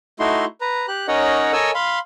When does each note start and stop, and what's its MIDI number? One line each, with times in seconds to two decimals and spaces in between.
0.20 0.45 57
0.20 0.45 63
0.20 0.45 64
0.20 0.45 66
0.20 0.45 84
0.61 0.86 71
0.61 0.86 82
0.88 1.07 67
0.88 1.07 90
1.08 1.53 61
1.08 1.53 63
1.08 1.53 70
1.08 1.53 73
1.08 1.53 75
1.08 1.53 78
1.53 1.71 69
1.53 1.71 70
1.53 1.71 73
1.53 1.71 75
1.53 1.71 80
1.53 1.71 88
1.75 1.99 77
1.75 1.99 83
1.75 1.99 84